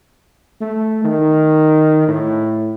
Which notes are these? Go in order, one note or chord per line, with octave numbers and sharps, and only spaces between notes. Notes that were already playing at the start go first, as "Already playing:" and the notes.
A3
D#3
A2